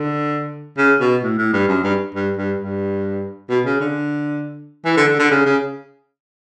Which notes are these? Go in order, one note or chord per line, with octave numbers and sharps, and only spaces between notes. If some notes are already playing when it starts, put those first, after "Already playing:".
Already playing: D3
C#3
B2
A2
A2
G2
F#2
G2
G2
G2
G2
B2
C#3
D3
E3
D3
D3
D3
C#3
C#3